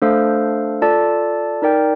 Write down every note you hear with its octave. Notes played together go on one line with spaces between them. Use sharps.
A3 D4 A4 C5 F5
F4 A4 D5 A5
D#4 A#4 D5 G5